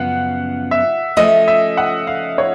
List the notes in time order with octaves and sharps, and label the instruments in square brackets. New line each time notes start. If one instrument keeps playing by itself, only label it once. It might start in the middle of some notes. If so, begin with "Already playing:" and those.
Already playing: [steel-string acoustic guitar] F#2 C#3 F3 B3 [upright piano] F5 F#5
[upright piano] E5
[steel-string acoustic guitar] F3 A3 C#4 [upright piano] D#5
[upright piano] E5
F#5
F5
C#5